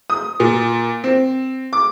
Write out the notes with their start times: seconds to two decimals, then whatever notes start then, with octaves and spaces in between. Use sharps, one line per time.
0.10 D#6
0.40 A#2
1.04 C4
1.73 D6